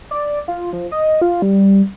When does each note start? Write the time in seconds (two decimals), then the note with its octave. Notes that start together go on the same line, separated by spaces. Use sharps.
0.11 D5
0.48 F4
0.73 F3
0.92 D#5
1.22 F4
1.42 G3